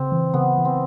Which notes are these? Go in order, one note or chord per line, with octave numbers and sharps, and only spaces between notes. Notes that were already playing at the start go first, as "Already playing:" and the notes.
Already playing: C#3 C4
E3
C#3 B3
E3
C4